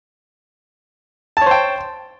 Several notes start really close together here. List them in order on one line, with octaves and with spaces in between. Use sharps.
A5 C#5 C5 G5